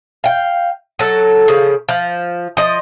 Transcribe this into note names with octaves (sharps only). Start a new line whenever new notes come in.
F5 G5
F#3 A4
C#3 F3
F3
F3 D#5